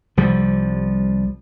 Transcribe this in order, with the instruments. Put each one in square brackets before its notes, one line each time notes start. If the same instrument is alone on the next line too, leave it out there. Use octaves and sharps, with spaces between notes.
[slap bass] C2 F3 G3